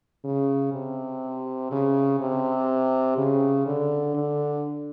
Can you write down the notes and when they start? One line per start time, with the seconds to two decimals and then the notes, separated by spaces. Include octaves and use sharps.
0.25 C#3
0.73 C3
1.72 C#3
2.20 C3
3.17 C#3
3.66 D3
4.15 D3